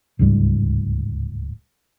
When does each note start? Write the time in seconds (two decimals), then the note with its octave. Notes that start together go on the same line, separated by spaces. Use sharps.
0.19 D1 C#2 G#2 G3